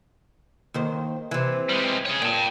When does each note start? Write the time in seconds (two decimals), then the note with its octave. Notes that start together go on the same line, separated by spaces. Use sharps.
0.74 D#2 D#3 C5
1.31 C3 E3
1.69 G3 G#3
2.05 G#4 C#5
2.22 A#2 G5 A5